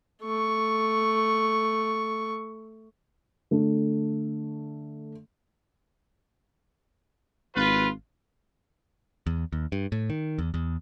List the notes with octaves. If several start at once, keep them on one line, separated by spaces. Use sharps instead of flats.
A3 C#6
D3 A3
G#1 F4 B4
E2
D#2
G2
A2
D#3
E2
E2